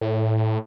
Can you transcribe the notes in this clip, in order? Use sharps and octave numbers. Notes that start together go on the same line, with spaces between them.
A2